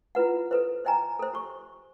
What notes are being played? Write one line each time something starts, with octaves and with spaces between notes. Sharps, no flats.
E4 F4 B4 F#5
A4 B4 C5
C5 D#5 G5 G#5 A#5
A4 C5
G4 C#6